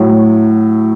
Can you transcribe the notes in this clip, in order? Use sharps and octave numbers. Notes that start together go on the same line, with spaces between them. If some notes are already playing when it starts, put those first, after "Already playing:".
Already playing: A2 F#3